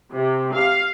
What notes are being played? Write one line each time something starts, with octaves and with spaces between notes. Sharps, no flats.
C3
F5